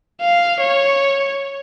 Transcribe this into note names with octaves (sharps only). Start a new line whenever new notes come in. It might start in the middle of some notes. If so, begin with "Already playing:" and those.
F5
C#5